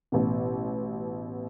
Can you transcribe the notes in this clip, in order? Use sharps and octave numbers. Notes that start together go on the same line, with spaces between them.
A1 B2